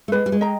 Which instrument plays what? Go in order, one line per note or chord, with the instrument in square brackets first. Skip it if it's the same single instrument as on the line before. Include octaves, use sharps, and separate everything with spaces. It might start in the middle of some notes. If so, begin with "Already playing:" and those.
[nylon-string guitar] A3
[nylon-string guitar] G#3 [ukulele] B4
[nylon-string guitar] G3
G#3
[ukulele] D#5 G5 A#5